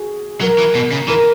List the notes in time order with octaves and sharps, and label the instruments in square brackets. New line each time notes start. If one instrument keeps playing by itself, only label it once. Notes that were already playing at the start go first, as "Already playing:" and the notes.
Already playing: [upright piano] F#4 G#4
[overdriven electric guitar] F#3 [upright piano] A#4
[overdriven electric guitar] E3
B2
C#3
[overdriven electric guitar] E3 [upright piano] A#4